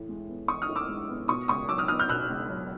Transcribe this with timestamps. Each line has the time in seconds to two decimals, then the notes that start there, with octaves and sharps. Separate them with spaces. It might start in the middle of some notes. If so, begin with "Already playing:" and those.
Already playing: A2 E3
0.09 G#3
0.28 B3
0.48 E3 C#6 D#6
0.62 D#6 F6
0.69 A2
0.76 D6 E6
0.88 G#3
1.09 B3
1.28 B2 C#6 D#6
1.48 C#2 C#6 D#6
1.69 F#3 D6 E6
1.78 D#6 F6
1.88 B3 D#6 F6
1.99 F6 G6
2.09 B2 E6 F#6
2.30 C#2
2.49 F#3